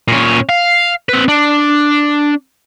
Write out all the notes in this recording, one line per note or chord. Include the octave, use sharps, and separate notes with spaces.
A#2 C#4
F5
C4 B4
D4